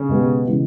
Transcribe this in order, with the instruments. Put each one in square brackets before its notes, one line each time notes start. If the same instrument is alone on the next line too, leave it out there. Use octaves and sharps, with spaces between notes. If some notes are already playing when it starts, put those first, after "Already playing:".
Already playing: [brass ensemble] C#3
[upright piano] B2 G#3 B3 G4
C#3 E3 G#3